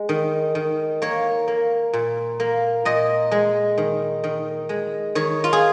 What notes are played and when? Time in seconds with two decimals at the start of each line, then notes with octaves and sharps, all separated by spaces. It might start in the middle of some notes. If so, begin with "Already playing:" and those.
Already playing: G#3
0.09 D#3
0.55 D#3
1.02 A#3 C#5
1.48 A#3
1.93 A#2
2.40 A#3
2.85 A#2 D#5
3.31 G#3
3.78 D#3
4.24 D#3
4.69 G#3
5.15 D#3 C#5
5.44 F4
5.53 G#4